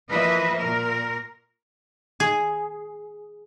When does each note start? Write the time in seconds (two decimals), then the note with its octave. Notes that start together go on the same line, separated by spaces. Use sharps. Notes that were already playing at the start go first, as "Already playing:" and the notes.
0.10 E3 F3 A#3 B4 D#5 E5
0.59 A#2 A#4
2.20 G#4